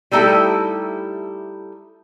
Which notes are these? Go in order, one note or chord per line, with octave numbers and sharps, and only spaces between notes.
G3 A3 D#4 E4 G4 A4